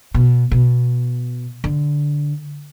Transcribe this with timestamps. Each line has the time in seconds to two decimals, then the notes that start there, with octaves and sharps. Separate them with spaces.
0.14 B2
0.52 B2
1.64 D3